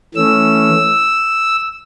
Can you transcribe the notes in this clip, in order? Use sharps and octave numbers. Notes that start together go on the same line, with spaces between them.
E3 A3 C#4 E6